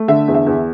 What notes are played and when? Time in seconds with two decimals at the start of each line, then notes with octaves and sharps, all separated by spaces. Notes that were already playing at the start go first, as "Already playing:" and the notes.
Already playing: A3
0.08 D3 E5
0.28 E2
0.34 E5
0.46 E2